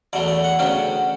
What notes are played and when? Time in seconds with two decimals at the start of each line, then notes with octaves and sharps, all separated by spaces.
0.13 E2 B2 F#3 A3 D5
0.28 D5
0.44 F#5
0.59 D2 C#3 F#3 C#4 G5